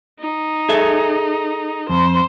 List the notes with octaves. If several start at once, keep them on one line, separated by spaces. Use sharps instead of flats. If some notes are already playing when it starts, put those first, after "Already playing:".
D#4
G#4 A4 E5
F2 C5